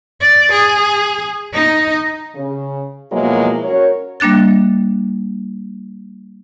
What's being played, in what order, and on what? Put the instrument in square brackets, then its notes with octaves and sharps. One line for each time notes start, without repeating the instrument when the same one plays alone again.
[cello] D5
G#4
D#4
[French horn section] C#3
B2 F3 F#3 G#3 A#3 E4
C#4 F#4 A#4 C#5
[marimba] G3 A#3 D4 F#6 A6